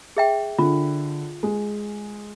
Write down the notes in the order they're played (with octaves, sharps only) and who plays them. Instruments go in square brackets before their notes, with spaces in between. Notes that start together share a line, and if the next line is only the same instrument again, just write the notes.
[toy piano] G#4 E5 G5
[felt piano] D3 [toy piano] F4
[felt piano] G#3